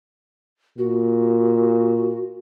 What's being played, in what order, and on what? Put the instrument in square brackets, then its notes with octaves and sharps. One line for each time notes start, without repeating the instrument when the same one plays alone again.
[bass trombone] A#2 [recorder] F#4